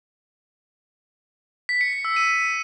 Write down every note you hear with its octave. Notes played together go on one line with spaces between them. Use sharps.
B6
C#7
C#7
E6
D#7